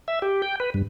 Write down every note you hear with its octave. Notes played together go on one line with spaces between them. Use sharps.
E5
G4
G5
B4
G2